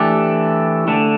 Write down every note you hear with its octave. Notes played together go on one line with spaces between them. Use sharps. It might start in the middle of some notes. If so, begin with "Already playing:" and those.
Already playing: E3 A3 D4 G4
D3 A3 D4